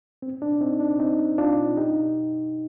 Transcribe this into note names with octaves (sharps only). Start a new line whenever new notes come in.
C4
D4
C4 D#4
D4
C4 D#4
D4 F4
D#4 G4